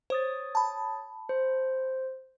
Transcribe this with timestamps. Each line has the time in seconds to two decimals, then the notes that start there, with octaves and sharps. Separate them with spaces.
0.10 C5 C#5 D#6 A6
0.55 A5 B5
1.29 C5